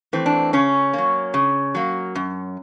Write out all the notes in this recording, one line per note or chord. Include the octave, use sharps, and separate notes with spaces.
E3 A3 C4
D4
C#3 C#4
F#3 A#3
C#3
F#3 A#3
F#2